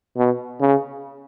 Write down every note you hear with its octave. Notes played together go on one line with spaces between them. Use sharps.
B2
C#3